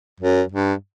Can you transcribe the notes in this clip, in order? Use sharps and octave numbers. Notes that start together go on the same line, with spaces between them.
F#2
G2